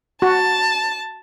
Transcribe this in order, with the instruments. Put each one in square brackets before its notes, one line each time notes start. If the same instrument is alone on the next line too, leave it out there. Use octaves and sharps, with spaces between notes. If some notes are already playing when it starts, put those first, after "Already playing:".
[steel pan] F#4 [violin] A5